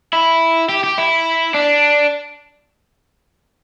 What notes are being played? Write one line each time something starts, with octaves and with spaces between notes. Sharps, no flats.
E4
G4
G4
E4
D4